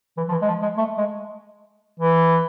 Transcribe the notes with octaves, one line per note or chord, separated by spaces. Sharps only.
E3
F3
E3
G#3
F3
G#3
A3
G#3
E3